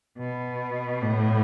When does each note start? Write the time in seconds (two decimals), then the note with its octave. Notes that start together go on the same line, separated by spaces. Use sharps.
0.18 B2
1.02 A2